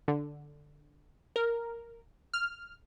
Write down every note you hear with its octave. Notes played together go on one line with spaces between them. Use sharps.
D3
A#4
F6